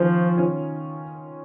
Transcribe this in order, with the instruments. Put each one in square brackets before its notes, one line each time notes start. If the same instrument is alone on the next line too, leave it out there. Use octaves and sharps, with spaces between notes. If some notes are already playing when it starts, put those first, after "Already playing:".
Already playing: [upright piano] D#3 C#4 F4 [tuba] F3
[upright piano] D#3 C#4 F4